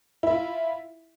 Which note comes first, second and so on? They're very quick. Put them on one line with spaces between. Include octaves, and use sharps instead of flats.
E4 E5 F4